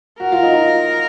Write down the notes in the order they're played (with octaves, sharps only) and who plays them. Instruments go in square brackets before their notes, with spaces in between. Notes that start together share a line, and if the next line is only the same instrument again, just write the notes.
[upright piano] F#4 [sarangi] A#4
[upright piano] F4
D#4
F4